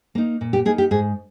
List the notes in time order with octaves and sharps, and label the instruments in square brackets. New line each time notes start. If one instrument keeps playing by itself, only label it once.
[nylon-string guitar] A#3 D#4
A#2
G4
A#3 D#4 G#4
G4
G#2 G#4